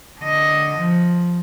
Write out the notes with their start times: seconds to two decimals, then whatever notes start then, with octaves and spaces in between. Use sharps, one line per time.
0.20 D3 D#5
0.77 F3